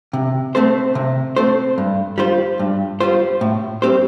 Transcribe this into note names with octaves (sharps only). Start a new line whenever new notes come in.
C3
A3 C4 A4 C5
C3
A3 C4 A4 C5
G2
G3 F4 C5
G2
G3 F4 C5
A2
G3 C4 G4 C5